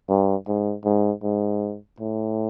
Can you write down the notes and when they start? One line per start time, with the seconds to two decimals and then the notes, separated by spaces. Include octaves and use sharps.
0.09 G2
0.48 G#2
0.85 G#2
1.23 G#2
2.00 A2